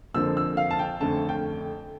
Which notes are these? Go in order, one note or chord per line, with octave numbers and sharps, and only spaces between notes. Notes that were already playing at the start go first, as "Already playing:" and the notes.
F2 D3 F3 A#3 E6
E6
F5
A5
G5
F2 D3 A3 C#4 A5
G5